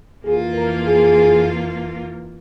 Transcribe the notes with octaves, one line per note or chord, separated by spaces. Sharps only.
F2 E3 A#3 F4 G#4
A#4
G#4